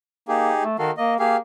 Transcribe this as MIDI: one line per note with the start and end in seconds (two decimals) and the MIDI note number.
0.28 0.52 58
0.28 0.64 63
0.28 0.64 67
0.28 0.64 68
0.63 0.77 57
0.79 0.91 51
0.79 0.91 66
0.79 0.91 69
0.79 0.91 77
0.97 1.17 58
0.97 1.14 75
1.19 1.37 58
1.19 1.37 67
1.19 1.37 68
1.19 1.37 77